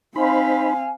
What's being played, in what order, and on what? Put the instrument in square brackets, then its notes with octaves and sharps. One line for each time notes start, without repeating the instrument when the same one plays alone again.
[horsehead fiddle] C4 F5 [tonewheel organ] D#4 C5 B5 [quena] G#5